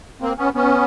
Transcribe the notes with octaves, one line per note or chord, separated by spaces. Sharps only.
A#3 C4
B3 C#4
B3 C#4